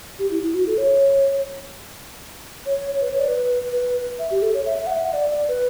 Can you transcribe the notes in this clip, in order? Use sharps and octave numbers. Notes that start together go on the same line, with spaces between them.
G4
E4
E4
F#4
A4
C#5
C#5
B4
C#5
D5
B4
B4
E5
G4
A4
C#5
E5
E5
F#5
E5
F#5
D5
D5
B4